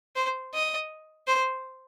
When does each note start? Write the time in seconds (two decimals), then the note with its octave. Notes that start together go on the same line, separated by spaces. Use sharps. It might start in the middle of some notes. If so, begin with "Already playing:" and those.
0.16 C5
0.54 D#5
1.27 C5